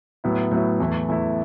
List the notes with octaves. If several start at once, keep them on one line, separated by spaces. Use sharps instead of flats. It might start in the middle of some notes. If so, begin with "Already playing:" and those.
A2 F#3 B3 E4
A2 F#3 B3 E4
E2 E3 A3 E4
E2 E3 A3 E4